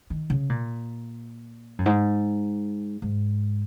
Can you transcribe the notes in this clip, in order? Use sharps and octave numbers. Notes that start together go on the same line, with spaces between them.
D#3
C#3
A#2
F#2
G#2
G#2